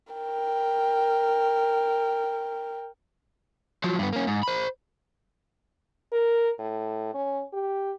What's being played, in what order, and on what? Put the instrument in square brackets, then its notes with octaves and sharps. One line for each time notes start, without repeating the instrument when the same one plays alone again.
[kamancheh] A#4 G5
[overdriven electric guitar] F3 F#3
G2 B3
A#3 C#4
G#2
C5 B5
[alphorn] A#4
A2
C#4
G4